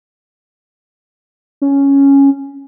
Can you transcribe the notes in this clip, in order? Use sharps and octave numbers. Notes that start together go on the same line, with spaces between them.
C#4